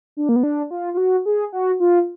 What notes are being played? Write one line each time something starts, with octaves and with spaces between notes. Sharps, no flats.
D4
A#3
B3
D4
F4
F4
F#4
G#4
F#4
F4